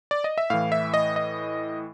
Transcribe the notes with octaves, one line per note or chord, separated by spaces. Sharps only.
D5
D#5
E5
A2 E3 F5
E5
D#5
D#5